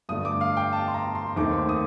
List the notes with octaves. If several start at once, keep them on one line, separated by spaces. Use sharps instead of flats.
G2 D3 A3 D4 D#6
D6
F5
G5
A5
C6
A#5
C6
D#2 D#3 A3 C4 D6
D#6